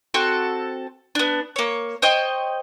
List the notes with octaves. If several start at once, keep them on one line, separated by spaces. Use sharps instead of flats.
C4 F#4 A4
B3 D4
A#3 C#5
C5 C#5 D#5 G5